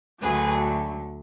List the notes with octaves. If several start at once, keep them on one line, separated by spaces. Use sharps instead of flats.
D2 D3 F#3 G#4 B4